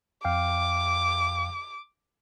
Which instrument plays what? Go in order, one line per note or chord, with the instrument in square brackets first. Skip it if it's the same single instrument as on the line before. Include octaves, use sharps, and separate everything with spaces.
[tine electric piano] F2 F5 G5 [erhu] D6